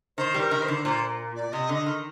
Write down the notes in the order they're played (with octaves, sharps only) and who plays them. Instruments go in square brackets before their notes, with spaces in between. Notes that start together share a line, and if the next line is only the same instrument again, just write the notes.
[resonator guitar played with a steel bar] D#3 [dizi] C5
[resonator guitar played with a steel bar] G3
[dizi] A#4
[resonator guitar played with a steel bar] D#3
[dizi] C5
[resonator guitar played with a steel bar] D3
[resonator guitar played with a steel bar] A#2 [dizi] C5
[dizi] D5
[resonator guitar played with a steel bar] C3 [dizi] D#5
[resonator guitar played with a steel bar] D3
[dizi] D#5
[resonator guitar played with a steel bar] D#3